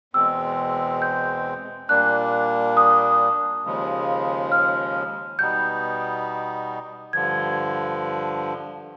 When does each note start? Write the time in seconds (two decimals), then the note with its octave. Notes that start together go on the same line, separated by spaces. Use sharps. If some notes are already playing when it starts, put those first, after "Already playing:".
0.14 E2 B2 G#3 C4 E6
1.02 G6
1.89 A#2 G3 A#3 D4 F#6
2.77 D#6
3.64 D#2 C#3 F3 G#3
4.52 F6
5.39 B2 G3 B3 D#4 G6
7.13 G2 D3 F3 G#6